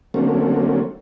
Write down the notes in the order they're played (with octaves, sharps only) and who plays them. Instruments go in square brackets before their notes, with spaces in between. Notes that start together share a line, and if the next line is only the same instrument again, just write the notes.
[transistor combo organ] D3 F#3 A3 A#3 C4 C#4